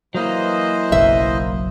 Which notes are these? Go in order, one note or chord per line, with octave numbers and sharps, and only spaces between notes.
E3 F#3 A#3 C5 D#5
F#1 B1 F#2 E5